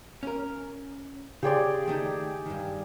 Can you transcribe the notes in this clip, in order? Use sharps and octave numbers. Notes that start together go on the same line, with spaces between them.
C#4 A#4
C#3 G4 G#4 C#5 D5 C6
D#3 A3 D#4
G2 D#3